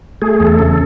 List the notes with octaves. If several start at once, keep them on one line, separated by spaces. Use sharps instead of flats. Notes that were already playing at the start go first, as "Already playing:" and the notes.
A3 G#4
G#4
E2
A4
C#3